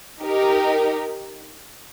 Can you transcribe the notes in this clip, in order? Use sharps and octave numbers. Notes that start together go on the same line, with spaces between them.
D#4 G4 A#4